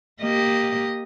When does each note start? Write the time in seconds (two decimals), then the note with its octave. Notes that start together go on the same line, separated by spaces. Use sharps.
0.21 A#3 G4 D#5